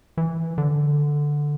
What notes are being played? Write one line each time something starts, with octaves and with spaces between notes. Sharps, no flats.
E3
D3